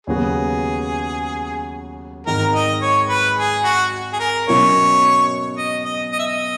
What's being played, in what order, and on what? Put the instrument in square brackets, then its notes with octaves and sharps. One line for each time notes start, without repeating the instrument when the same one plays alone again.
[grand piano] D#2 C#3 F#3 B3 F#4 [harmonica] G#4
[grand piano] G#1 G#2 D#3 G#3 [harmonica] A#4
[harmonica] D#5
C#5
B4
G#4
F#4
G#4
A#4
[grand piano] B2 F#3 C#4 E4 A#4 [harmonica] C#5
[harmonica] D#5
D#5
D#5
E5
D#5